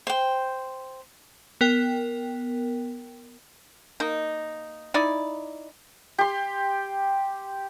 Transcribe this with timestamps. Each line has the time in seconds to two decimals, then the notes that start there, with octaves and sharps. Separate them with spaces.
0.07 C5 G5
1.61 B3 A#4 G5
4.00 A#3 D#4
4.94 D#4 E4 D5
6.18 G4 C6